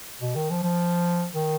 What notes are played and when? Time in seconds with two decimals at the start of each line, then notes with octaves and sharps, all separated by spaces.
0.21 B2
0.36 D#3
0.51 F3
0.63 F3
1.34 D#3